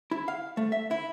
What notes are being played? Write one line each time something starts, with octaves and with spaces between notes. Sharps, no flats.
E4
F5
A3
E5
E4